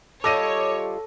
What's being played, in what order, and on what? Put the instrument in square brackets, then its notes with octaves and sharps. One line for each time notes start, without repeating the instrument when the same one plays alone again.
[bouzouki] G3 F4 D#5 [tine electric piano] A4 [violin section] C#5 [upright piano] D6 A#6 D#7